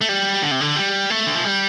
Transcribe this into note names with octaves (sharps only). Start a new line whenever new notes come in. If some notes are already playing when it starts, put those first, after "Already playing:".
A3
G3
D3
C3
D3
G3
A3
D3
F3
G3